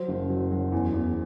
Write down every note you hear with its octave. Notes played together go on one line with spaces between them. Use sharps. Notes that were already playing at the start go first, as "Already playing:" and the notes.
Already playing: F#3 C5
F#1
F#3
F#3
E2
E2